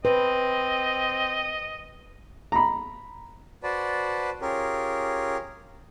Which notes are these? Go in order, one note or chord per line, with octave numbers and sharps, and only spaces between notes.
C4 B4 D#5
A#5 B5
F#4 B4 C5 D5 A5
C#4 F4 G4 G#4 A#4